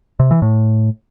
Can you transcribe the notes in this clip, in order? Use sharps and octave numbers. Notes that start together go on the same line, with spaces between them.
C3
E3
A2